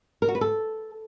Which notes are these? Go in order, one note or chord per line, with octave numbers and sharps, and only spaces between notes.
A#4
F#4
B4
A4